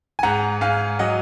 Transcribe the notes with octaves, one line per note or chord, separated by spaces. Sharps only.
G#5
G#2 F#5 A#5
G#2 F5 G#5
F#3 D#5 F#5